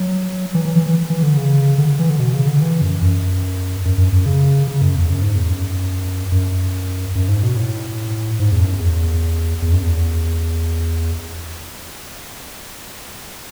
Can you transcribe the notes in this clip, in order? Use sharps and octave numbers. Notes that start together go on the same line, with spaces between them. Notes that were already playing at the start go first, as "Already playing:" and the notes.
Already playing: F#3
E3
E3
E3
E3
E3
D3
C#3
D3
E3
D3
B2
C#3
D3
E3
F#2
F#2
F#2
F#2
F#2
C#3
C#3
F#2
E2
F#2
G#2
E2
F#2
F#2
F#2
G#2
B2
A2
G#2
E2
F#2
E2
E2
F#2
E2